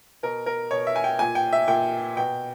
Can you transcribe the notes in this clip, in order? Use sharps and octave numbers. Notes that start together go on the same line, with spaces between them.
B2 A#4
A#4
B2 C#5
E5
G#5
G5
A#2 G#5
G5
E5
A#2 G5
B2 G5